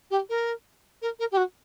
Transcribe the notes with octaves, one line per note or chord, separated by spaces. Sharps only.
G4
A#4
A#4
A#4
G4
F#4